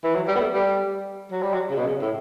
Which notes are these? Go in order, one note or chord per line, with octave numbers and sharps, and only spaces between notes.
E3
F#3
G3
B3
A3
G3
F#3
G3
F#3
C#3
B2
C#3
A2